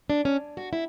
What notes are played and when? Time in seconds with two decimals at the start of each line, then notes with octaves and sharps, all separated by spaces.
0.10 D4
0.25 C#4
0.57 F#4
0.73 E4